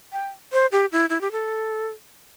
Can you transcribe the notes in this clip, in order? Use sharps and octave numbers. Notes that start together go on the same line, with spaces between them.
G5
C5
G4
E4
E4
G4
A4